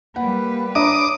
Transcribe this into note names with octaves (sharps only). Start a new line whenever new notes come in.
G3 A#3 B4 F#5
D4 C#5 E5 A#5 D6 D#6